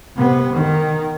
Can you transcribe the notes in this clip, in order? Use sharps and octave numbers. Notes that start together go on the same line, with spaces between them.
C3 B3
D#3